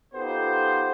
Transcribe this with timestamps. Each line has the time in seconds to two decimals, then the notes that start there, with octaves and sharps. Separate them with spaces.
0.14 B3 D#4 F4 G4 A4 C5